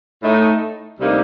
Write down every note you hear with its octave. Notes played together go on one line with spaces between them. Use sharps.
A2 A3 D#4
D2 C3 G3 A#3 D#4